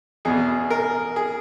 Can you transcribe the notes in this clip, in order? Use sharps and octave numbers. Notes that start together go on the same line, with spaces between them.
E2 B2 G#4
A#4
G#4